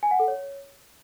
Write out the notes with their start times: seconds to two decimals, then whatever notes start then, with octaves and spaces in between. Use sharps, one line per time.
0.03 G#5
0.11 F#5
0.19 A4
0.28 C#5